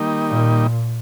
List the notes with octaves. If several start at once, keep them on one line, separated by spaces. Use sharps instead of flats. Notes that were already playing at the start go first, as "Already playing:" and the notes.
Already playing: D#3 G3 A#3 D#4
A#2